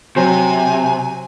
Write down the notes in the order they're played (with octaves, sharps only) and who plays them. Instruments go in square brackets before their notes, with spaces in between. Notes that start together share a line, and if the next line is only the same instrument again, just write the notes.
[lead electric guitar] C3 [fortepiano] F#3 C5 [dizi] G#5